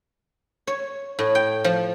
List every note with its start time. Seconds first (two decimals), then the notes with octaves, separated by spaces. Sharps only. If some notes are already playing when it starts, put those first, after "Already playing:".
0.67 C#5
1.19 A2
1.35 G5
1.64 F3